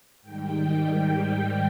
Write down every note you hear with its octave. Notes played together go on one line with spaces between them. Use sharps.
G#2 D#3 G3 G5
G5